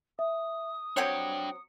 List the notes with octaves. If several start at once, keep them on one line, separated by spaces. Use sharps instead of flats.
E5 D#6
F#3 C4 D4 C#5 G5 C#7